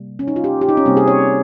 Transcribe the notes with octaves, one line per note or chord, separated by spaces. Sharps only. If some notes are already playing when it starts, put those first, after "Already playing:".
Already playing: C3 G3 A#3
C#4
D#4
F4
G4
G4
D#4
C#4
C3 G3 A#3 C4
G#4
C#5